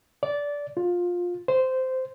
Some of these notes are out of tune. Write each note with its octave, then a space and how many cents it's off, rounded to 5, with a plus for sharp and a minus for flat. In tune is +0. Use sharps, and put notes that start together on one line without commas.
D5 -15
F4 +15
C5 -10